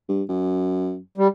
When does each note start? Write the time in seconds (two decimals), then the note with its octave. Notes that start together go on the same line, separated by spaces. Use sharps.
0.09 G2
0.29 F#2
1.18 G3